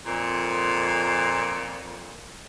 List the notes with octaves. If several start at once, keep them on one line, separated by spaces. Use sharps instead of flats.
F2 A#2